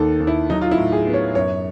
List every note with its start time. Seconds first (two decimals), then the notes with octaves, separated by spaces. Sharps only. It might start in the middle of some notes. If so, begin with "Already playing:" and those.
Already playing: D#2 D#3 A4
0.20 D#2
0.27 E4
0.50 F#3 D#4
0.61 F4
0.71 E4
0.78 A2
0.92 G#4
1.07 B3
1.14 C#5
1.35 F#2 C#5